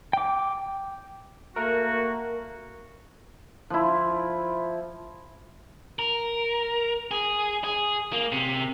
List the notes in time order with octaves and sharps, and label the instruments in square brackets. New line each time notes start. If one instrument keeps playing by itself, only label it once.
[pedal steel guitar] G5 D6
[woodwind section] A3 A#3 F#4 [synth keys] A#4
[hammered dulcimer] F3 E4
[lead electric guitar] A#4
G#4
G#4
A#3
C3